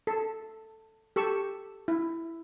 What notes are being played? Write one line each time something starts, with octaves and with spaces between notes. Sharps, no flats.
A4
G4 A4 C#6 E6
E4